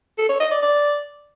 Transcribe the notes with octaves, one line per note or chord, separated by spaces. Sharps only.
A4
C#5
D#5
D5
D5